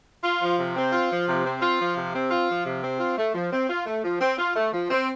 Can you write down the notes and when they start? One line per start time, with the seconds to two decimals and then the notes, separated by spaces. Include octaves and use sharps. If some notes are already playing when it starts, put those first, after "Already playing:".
0.24 F4
0.41 F3
0.58 C3
0.75 C4
0.93 F4
1.10 F3
1.27 C3
1.45 C4
1.62 F4
1.79 F3
1.96 C3
2.14 C4
2.31 F4
2.48 F3
2.65 C3
2.83 C4
3.00 F4
3.17 A3
3.34 F3
3.52 C4
3.69 F4
3.86 A3
4.04 F3
4.21 C4
4.38 F4
4.56 A3
4.72 F3
4.90 C4